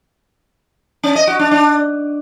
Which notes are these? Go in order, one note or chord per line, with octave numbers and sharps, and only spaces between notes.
C#4
D#5
F#4
D4
D4